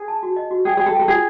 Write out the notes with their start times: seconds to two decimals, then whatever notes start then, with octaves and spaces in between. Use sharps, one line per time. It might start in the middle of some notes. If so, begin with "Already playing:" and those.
Already playing: G#4
0.08 A5
0.23 F#4
0.36 D#5
0.51 F#4
0.65 G#4 G5
0.77 G#4 G5
0.86 A4
0.94 G5
1.00 A4
1.08 F4 G#4